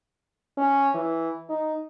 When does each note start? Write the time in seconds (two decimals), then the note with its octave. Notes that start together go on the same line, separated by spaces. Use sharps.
0.57 C#4
0.94 E3
1.49 D#4